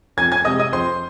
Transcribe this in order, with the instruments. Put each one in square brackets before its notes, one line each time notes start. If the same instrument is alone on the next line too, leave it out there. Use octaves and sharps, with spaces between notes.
[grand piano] F2 G#5 G#6
G#5 G#6
C3 G#3 D#5 D#6
D#5 D#6
F2 C5 C6